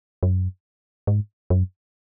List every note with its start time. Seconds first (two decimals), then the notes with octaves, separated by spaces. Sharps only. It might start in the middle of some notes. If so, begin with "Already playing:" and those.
0.23 F#2
1.07 G#2
1.50 F#2